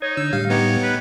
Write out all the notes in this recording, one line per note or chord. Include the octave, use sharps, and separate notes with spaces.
D#4 C#5 D#6 G#6
D3 E6
A2 G3 F5
B3 D#4 G4 C#5
B4